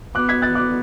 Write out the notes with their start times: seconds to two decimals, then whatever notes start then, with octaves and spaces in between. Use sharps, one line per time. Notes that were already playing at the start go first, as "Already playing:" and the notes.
0.15 B3 D6 F#6
0.29 G#6 B6
0.42 F#6 A6
0.55 D6 F#6